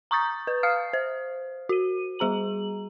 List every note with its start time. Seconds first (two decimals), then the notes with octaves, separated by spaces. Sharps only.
0.11 A#5 C#6 D#6 G6 A6
0.47 B4
0.63 F5 D#6 F6 C7
0.93 C5
1.69 F#4 D#7
2.19 G3 G#4 A#5 F#7